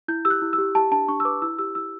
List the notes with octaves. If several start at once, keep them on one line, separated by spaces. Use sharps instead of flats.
E4 G6
G4 E6
F#6
E4
E6
G4
G4 A5
D4 A5
D4 C#6
E6
B4 D6
E4 E6
G4 E6
E4 E6